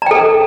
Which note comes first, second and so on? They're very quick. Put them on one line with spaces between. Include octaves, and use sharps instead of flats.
A#5 G5 A4